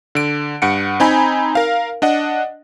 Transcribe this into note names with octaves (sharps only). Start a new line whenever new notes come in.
D3 D7
G2 F#5 C#7 D7
C4 D#4 G#5 B5
A#4 F5
D4 D#5 F#5